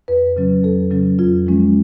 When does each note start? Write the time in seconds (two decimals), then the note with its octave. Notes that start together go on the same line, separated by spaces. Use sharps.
0.08 F2 B4
0.37 C#3 F#3 C#4
0.63 F2 A4
0.91 C#3 F#3 C#4
1.19 F2 F4
1.47 F3 G#3 C#4